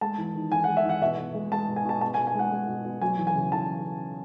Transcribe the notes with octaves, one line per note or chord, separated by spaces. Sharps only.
G#3 A5
E2
D#3
E2 G#5
F#5
G#3
E5
E2 F#5
B2 E5
B2
G#3
G#3 A5
B2
G#5
B2 A5
B2 A5
G#5
B2
G#5
G#3 F#5
G#3
B2
B2
F#3 G#5
E2
G#5
C#3
E2 A5